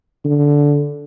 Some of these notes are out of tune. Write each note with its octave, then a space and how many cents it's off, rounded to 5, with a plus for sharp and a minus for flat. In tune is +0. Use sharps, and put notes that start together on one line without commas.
D3 -15